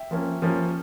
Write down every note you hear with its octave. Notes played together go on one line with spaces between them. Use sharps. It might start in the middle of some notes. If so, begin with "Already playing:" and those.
Already playing: E5 G5
F3 A#3 C#4
F3 A#3 C#4